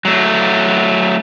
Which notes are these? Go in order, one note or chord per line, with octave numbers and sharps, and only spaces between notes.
F#3 A3